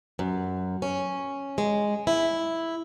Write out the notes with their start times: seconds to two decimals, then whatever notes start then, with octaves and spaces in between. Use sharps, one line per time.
0.19 F#2
0.82 C#4
1.58 G#3
2.07 E4